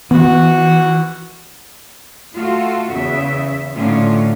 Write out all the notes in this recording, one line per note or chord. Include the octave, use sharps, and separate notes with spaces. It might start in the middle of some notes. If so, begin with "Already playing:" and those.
E3 B3 F#4
A3 F4 F#4 A4
E2 C#3 E5
A2 D3 C#4 D#4 F4